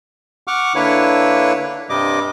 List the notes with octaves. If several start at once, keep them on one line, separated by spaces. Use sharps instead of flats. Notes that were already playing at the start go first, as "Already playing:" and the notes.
F#5 C#6 D6 F6
D3 A#3 D4 E4 B4 C#5
G2 C3 G3 D#5 D6